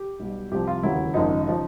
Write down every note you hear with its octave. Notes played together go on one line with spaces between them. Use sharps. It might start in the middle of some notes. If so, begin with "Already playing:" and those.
Already playing: G4
B1 B2 G3
C2 C3 F3 G4
F4
E1 D#2 C#3 F#3 E4
G#1 F#2 C#3 F3 D#4
C#3 F3